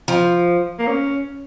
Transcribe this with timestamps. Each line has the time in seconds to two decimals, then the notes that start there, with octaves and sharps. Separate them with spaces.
0.08 F3
0.79 A#3
0.87 C#4